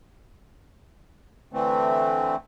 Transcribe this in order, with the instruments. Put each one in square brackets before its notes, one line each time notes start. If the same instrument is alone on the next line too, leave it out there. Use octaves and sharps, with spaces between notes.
[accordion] D3 E3 A3 C4